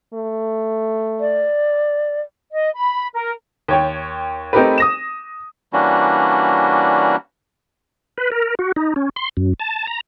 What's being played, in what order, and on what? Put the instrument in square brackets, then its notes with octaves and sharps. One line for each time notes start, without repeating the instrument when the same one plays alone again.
[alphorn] A3
[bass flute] D5
[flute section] D#5
B5
A#4
[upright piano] D#2 C#5 G5
A3 C4 D#4 G4 A#4 B4
D#6 A#6 E7
[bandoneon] E3 G3 A#3 C#4 D4 F#4
[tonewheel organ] B4
A#4
F#4
D#4
C#4
C6
F#2
A5
A#5